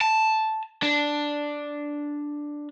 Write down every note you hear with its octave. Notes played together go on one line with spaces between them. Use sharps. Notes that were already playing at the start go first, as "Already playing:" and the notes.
A5
D4